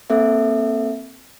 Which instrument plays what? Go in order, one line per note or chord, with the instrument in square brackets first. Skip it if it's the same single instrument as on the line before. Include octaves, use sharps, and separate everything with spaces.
[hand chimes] A#3 C4 A4 E5